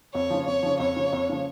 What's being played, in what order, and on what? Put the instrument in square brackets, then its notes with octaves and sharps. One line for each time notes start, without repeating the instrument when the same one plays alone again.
[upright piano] F2 [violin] C#5
[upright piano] C#3 F3
[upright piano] F2 [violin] C#5
[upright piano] C#3 F3
[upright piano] F2 [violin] C#5
[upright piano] C#3 F3
F2
C#3 F3